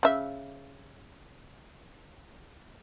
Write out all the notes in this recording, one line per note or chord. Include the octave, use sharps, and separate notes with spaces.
C#3 E5